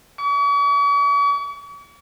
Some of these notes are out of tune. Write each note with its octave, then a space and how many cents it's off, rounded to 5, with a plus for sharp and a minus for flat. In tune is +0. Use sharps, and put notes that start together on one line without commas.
C#6 +45